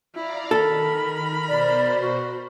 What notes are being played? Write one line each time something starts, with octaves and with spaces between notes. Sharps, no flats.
E4 D5 F5 A#5
D#3 A4 A#4 B5
B2 C5 D5
F#4